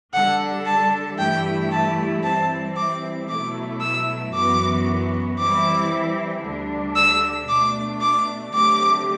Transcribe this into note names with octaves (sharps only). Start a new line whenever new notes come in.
D3 G3 D4 A4 F#5
A5
G2 E3 A3 E4 G4 G5
A5
E3 G3 C4 E4 A5
D6
B2 F#3 A3 E4 A4 D6
E6
F#2 E3 B3 F#4 D6
E3 G3 C4 E4 D6
D2 D3 G3 D4
E6
B2 A3 D4 D6
D6
D3 F#3 A3 C4 G4 D6